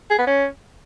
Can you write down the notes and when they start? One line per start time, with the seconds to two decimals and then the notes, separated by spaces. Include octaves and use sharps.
0.10 G#4
0.18 B3
0.27 C#4